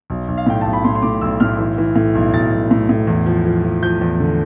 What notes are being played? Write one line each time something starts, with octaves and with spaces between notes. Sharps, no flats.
B1
B1
F5
A2 G5
B1 A5
B5
A2 C6
C6
A2 D6
B1 E6
A2 F6
E3
E3
A2
B1
B1 A6
B1
A2
A2
E2
F3
F3
F3
F3 G6
E2
D3